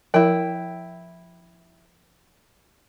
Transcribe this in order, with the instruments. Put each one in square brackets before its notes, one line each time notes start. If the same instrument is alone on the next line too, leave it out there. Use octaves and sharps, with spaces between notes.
[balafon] F3 A#4 [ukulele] E4 G5